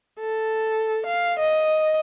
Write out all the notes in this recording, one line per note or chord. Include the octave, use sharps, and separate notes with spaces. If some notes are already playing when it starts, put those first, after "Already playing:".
A4
F5
D#5